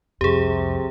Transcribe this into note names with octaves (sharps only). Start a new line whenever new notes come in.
C2 F2 C3 G4 G#4